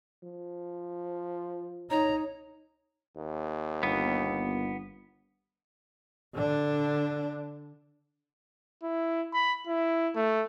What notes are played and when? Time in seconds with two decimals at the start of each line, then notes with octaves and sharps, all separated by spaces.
0.23 F3
1.90 D#4 C#5 A#5
3.16 D#2
3.83 G1 B3
6.34 D3 D4
8.83 E4
9.33 B5
9.67 E4
10.15 A3